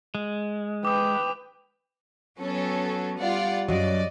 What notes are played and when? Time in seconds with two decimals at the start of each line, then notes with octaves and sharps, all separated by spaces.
0.15 G#3
0.85 B4 G5 D6 D#6
2.39 F#3 B3 C#4 A4
3.20 G3 F4 D5 F#5
3.69 F#2 F#3 D5 D#5